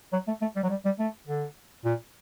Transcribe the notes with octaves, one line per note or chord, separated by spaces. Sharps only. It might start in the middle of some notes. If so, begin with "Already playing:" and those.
F#3
A3
A3
G3
F#3
G3
G3
A3
D3
A#2